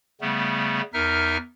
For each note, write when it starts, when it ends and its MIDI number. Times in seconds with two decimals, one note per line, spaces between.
0.21 0.81 49
0.21 0.81 55
0.21 0.81 57
0.21 0.81 59
0.94 1.37 40
0.94 1.37 63
0.94 1.37 70
0.94 1.37 76
0.94 1.37 89